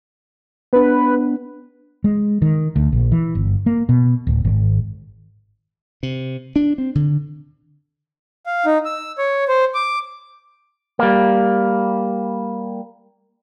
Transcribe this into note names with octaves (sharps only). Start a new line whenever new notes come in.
B3 D4 B4
G#3
D#3
D2
A#1
E3
G1
A#3
B2
D1
G#1
C3
D4
C4
D3
F5
D#4
E6
C#5
C5
D6
G3 A#3